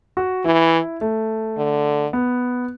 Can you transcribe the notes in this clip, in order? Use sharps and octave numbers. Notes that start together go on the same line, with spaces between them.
F#4
E3 E4
A3
D3
B3